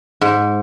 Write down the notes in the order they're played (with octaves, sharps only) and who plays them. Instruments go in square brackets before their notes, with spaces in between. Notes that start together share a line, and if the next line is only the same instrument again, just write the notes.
[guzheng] G#2